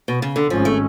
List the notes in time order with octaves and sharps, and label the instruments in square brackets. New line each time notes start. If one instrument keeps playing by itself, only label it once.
[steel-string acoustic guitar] B2
C#3
D3
[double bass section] G#1 G#2 G#3 C#4 [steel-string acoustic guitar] F3
[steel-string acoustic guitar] A3